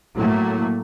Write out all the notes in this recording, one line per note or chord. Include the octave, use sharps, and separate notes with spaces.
A2 F#3 A3 A#3